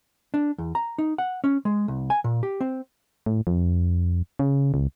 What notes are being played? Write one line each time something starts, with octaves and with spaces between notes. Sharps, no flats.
D4
E2
A#5
D#4
F#5
C#4
G#3
C2
G#5
A#2
G4
C4
A2
F2
C#3
C#2